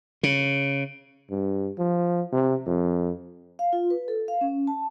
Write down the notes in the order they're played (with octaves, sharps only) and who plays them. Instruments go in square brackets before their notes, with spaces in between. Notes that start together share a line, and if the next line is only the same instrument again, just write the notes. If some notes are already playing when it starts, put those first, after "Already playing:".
[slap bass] C#3
[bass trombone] G2
F3
C3
F2
[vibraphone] F5
F4
B4
A4
F5
C#4
A5